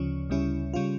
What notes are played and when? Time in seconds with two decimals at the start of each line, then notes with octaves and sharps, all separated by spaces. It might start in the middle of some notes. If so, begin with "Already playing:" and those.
Already playing: D2 C#3 F3 C#4
0.30 D2 C#3 G3 C#4 E4
0.74 C#3 G3 C#4 F4